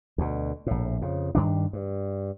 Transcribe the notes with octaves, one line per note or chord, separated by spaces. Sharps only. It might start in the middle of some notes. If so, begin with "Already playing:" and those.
D2 B2
A#1 A2
F2 C#3
G2 D#3 D4
G2